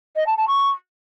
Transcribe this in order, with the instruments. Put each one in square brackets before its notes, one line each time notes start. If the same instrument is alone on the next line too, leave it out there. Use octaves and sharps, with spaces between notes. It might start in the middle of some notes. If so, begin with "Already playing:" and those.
[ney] D#5
A5
A5
C#6